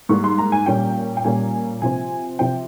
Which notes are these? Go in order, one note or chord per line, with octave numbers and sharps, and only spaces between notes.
G#2 G3 A#3 C#6
C6
A#5
G#5
A#2 G3 A#3 C#4 G5
G5
A#2 G3 A#3 C#4 G#5
C3 F3 C4 G#5
C3 F3 C4 G5